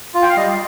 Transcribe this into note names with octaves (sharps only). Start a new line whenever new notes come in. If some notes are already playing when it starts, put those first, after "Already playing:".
F4
G5
F5
G3 D#5